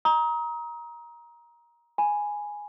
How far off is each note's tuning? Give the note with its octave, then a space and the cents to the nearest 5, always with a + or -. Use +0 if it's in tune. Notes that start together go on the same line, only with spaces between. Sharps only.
A#5 +20 D#6 +35
G#5 +0 B5 +0